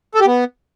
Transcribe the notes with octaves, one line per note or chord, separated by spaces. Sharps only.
A4
G4
B3